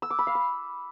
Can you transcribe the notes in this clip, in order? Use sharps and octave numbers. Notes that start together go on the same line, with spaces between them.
E6
D6
B5
F5
E6